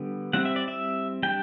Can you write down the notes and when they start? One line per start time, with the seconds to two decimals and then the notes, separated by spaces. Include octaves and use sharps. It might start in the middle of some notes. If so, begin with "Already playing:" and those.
Already playing: D3 G3 B3
0.33 G3 C4 E4 F#5
0.45 E5
0.56 D5
0.68 E5
1.23 G3 D4 G5